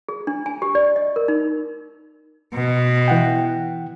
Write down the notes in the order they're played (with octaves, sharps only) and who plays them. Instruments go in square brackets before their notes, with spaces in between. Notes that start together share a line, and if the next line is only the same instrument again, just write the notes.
[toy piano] G#4
D4
G#5
G4
D5
D#5
A#4
D#4
[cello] B2
[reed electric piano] E3 F#5 G5